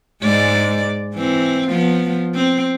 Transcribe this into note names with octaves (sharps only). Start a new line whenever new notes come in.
G#2 G#3 D5
E3 C4
F3 B3
C4